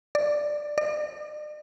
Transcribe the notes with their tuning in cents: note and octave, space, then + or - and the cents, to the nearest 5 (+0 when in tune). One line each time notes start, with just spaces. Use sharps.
D5 +10
D5 +45